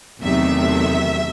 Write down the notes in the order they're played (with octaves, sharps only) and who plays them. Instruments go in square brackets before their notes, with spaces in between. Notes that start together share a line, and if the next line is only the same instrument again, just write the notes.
[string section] E2 C3 D#3 F#3 A3 E5